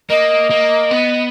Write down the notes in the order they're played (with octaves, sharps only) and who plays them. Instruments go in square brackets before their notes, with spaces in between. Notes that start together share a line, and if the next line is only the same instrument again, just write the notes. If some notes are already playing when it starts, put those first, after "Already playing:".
[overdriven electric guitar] A#3 [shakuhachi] D#5
[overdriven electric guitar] A#3
B3